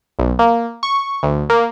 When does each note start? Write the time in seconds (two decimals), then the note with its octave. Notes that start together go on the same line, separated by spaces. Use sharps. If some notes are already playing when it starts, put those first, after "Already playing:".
0.19 B1
0.39 A#3
0.83 C#6
1.23 D2
1.50 A#3